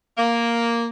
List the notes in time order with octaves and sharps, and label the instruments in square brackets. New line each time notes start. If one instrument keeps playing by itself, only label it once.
[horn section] A#3